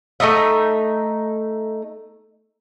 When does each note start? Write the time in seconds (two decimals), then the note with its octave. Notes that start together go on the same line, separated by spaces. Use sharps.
0.20 A3 D#4 D#5 E5